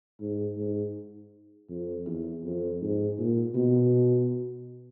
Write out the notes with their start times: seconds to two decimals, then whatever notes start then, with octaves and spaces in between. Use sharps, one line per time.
0.21 G#2
0.58 G#2
1.70 F2
2.07 E2
2.44 F2
2.82 G#2
3.19 A#2
3.55 B2